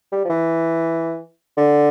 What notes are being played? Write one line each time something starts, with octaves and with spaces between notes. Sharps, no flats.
G3
F3
E3
D3